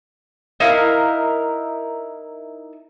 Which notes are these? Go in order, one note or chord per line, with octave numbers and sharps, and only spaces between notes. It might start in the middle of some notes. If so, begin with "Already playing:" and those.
D#4 E4 A#4 F5